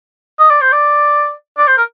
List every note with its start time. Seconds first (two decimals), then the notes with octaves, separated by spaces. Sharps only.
0.40 D#5
0.51 D5
0.61 C5
0.73 D5
1.58 D5
1.68 C5
1.78 A#4